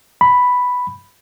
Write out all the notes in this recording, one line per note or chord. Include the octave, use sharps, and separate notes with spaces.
B5